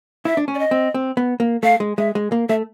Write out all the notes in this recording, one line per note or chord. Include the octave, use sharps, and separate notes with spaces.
E4 E5
D4
C#4
D5
D#5
C4
C4
B3
A#3
A3 F5
G#3
G#3 E5
G#3
A#3
A3 E5